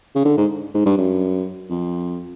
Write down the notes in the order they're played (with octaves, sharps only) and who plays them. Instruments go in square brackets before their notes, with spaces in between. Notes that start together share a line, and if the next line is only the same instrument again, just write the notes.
[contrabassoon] C#3
D3
G#2
G#2
G2
F#2
F2